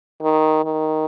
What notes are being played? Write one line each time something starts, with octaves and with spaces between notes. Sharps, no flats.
D#3
D#3